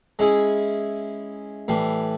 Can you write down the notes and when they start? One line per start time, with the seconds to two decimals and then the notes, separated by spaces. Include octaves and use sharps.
0.19 G#3 C#4 E4 G#4
1.68 A2 E3 G3